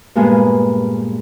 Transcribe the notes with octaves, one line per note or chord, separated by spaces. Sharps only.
G2 A#2 G#3 A#3 B3 G#4